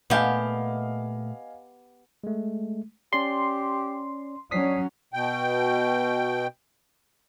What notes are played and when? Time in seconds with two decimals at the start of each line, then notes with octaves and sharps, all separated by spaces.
0.10 A#2 A3 B3 G4 D#5 F5 G#5
2.24 G#3 A3
3.13 C#4 G4 D5 C6
4.51 F#3 C#4 D4 D#6 B6 C7
5.13 B2 G5